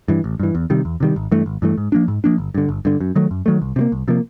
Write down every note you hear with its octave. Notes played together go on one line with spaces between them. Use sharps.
G2 E3
A1
G2 E3
E2
C3 D#3 G3
E2
C3 D#3 G3
G#1
G2 E3 A3
G#1
G2 E3 A3
G#2
F3 A#3 D4
G#2
F3 A#3 D4
G1
G2 D3
G1
G2 D3
F#2
D#3 F#3 A3
F#2
D#3 F#3 A3
C2
C3 F3 A#3
C2
C3 F3 A#3